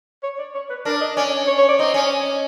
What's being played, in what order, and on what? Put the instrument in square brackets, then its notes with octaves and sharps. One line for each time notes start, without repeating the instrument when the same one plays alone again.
[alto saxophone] C#5
D5
C#5
B4
[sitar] D4 [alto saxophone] A#4
[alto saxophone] D#5
[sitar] C#4 [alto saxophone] D5
[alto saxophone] C#5
C#5
D5
[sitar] C4 [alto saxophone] D#5
[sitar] C#4